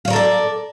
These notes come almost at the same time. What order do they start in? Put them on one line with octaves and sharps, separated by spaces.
F5 C#5 A#4 A4 D5